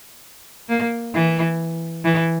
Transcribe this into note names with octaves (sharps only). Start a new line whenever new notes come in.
A#3
E3
E3